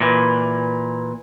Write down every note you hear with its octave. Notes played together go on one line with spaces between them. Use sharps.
A#2 E3